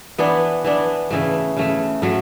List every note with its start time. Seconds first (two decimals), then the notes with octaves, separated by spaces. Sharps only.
0.18 E3 B3 D4
0.64 E3 B3 D4
1.11 C#3 E3 A3
1.57 C#3 E3 A3
2.02 A2 F#3 A3